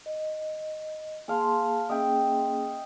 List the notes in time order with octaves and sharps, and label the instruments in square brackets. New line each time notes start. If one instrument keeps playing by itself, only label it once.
[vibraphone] D#5
[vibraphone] A#3 G#4 A5 [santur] C5 F5 G#5
[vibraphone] A#3 C#4 G#4 [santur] D#5 E5 G5